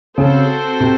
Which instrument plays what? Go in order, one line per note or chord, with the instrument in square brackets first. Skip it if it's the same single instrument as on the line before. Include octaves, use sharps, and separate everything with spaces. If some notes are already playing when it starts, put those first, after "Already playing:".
[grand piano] C#3 [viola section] C4 F#4 A4 C5
[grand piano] C3